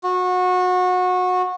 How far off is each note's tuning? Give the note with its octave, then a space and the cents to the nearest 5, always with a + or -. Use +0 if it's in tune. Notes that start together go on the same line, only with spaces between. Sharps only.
F#4 -25